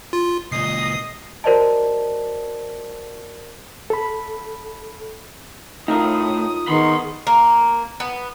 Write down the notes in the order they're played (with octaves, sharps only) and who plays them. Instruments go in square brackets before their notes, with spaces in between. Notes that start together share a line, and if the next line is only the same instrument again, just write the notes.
[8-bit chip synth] F4
[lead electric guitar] C#2 A#2 [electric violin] D#5 D#6 [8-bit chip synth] C7
[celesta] F#4 A#4 C5 D5 D#5 A5
[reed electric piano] A4 B5
[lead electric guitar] A2 [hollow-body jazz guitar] D#4 F4 A#4 [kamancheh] D#6
[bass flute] D#3 [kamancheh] B3 G#4 [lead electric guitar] B5 C6
[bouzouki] A#3
B3